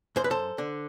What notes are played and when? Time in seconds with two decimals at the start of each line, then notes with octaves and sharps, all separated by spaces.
0.16 F#2 C5
0.24 B4
0.31 A4 C5
0.58 D3